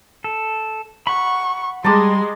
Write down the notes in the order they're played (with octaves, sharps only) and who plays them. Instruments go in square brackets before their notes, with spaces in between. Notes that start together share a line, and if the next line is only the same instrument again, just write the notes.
[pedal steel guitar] A4
[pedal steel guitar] F#5 B5 [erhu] C#6
[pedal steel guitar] G3 [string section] G#3 [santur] A5 A#5 D6 [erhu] C6